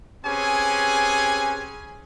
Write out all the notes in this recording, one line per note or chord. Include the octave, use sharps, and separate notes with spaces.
C4 C#4 G4 G#4 B4 G#5